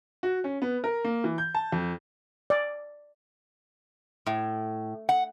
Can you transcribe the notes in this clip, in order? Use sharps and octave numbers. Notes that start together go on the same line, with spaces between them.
F#4
C#4
B3
A#4
A#3
E3
G6
A5
F2
D5
A2
F#5